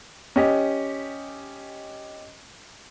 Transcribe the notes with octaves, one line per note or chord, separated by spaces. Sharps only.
C#4 G4 D#5